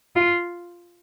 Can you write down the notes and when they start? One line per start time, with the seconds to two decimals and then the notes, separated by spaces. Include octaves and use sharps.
0.16 F4